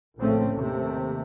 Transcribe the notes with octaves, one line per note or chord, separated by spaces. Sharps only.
A#1 A2 C#3 A3 C4 C#4
D#2 C3 A3